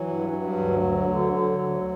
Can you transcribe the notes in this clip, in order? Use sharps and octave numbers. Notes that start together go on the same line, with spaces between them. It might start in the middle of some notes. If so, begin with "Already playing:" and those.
Already playing: E3 F#3
G2
G2
D2
D2
D3
D3
D2